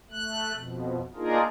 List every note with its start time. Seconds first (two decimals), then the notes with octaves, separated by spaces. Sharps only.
0.11 A3 F#6
0.53 F2 B2
1.16 A#3 D4 D#4 F4 G#4 A#4